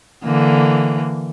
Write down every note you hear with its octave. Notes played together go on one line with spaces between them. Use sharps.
D3 E3 A#3